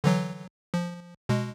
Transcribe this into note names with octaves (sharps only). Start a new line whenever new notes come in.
D3 E3 F#3
F3
B2 G#3